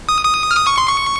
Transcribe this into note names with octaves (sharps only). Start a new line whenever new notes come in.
D#6
D#6
F6
D#6
C#6
C6
C#6